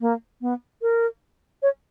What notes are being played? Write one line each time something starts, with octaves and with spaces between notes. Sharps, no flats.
A#3
B3
A#4
C#5